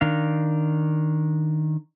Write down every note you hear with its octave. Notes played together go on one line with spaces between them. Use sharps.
D#3 D4 F5